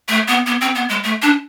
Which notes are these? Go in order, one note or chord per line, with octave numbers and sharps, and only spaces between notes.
A3
B3
B3
C4
B3
G#3
A3
D4